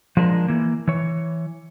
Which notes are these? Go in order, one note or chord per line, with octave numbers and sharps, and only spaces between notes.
F3 G#3 D4 A#4
E3 A#3
E3 C#5